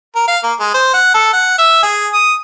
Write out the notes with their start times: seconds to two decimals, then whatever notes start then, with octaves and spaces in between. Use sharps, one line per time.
0.15 A#4
0.28 F5
0.44 A#3
0.60 G#3
0.74 C5
0.94 F#5
1.14 A4
1.33 F#5
1.59 E5
1.83 G#4
2.13 D#6